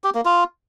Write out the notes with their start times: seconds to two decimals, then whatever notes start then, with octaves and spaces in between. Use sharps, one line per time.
0.04 G4
0.15 A#3
0.25 F4